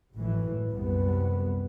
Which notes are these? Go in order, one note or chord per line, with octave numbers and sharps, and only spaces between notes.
G#1 F#2 A2 E3
C2 F#2 G3 B3